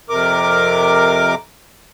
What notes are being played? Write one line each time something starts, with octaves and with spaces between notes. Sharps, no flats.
F2 C3 A#4 D6